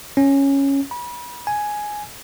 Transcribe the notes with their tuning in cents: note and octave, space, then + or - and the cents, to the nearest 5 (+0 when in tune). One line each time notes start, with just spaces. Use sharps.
C#4 -5
B5 -30
G#5 +5